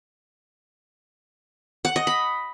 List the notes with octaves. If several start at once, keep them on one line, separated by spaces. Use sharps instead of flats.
F#5
D#5
B5